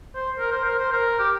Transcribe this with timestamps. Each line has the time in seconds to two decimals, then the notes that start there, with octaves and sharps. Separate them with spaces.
0.15 C5
0.39 A#4
0.51 C5
0.65 A#4
0.79 C5
0.92 A#4
1.19 G4